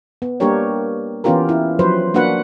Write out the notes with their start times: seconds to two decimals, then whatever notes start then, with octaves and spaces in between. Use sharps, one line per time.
0.22 B3
0.40 G3 A#3 D4 G4 A#4 C#5
1.24 E3 B3 C#4 F4 G4 A#4
1.49 E4
1.79 F3 F#3 B4 C5
2.14 A#3 D4 F#4 B4 F#5